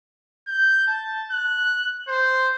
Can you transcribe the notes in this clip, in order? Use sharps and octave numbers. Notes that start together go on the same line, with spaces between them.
G6
A5
F#6
C5